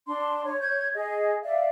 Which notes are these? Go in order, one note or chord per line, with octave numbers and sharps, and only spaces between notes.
D4 C6
C#5
C#5 G6 G#6
G#4 D#5
D5 E5 F5